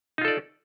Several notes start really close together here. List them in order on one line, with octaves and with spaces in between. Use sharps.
D#4 F4 A4 D5